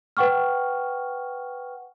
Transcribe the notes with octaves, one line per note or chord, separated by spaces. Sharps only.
B4 F#5 G5 C#6 F6